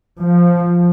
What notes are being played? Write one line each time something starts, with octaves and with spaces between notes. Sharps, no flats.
F3